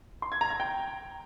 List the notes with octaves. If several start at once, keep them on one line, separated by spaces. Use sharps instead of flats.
C6
G#6
A#5
G#6
G5